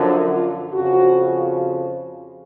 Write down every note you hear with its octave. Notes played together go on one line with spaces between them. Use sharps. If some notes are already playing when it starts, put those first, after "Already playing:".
Already playing: F#2 D3 F3
F4
F2 C#3 F3 F#4